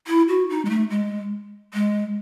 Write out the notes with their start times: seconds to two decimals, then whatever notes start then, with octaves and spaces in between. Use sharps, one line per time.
0.07 E4
0.28 F#4
0.50 D#4
0.65 G#3
0.70 A3
0.90 G#3
1.74 G#3